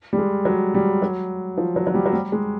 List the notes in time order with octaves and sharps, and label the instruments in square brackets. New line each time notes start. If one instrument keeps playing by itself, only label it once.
[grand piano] G3
G#3
F#3
G3
F#3
F3
F#3
F#3
G3
F#3
G3
G#3